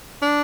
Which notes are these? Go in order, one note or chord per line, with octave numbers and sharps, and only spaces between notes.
D4